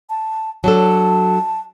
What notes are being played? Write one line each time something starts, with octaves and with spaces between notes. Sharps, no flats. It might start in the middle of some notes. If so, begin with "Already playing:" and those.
A5
F#3 D4 A4 A5